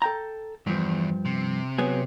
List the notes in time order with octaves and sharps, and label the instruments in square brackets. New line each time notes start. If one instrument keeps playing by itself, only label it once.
[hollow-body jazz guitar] A4 G5 A#5
[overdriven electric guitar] E2 [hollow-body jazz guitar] G2 F3
[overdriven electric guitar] C3
[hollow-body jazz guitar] F#3 B3 G#4